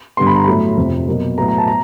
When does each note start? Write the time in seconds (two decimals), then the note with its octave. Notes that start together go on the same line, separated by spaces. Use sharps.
0.17 G2 D3 G3 B3 C6
0.27 B5
0.36 A#5
0.44 A2 F#3 A3 B5
0.77 F2 C3 F3
1.08 B2 F#3 A#3
1.38 A2 F#3 B3 A#5
1.48 A#5
1.58 A5
1.68 A#5